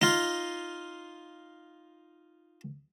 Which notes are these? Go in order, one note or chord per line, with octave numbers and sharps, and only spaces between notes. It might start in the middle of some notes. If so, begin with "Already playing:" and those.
D#4 F4